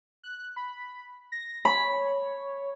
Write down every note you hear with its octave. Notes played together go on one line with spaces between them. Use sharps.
F#6
B5
A#6
C#5 B5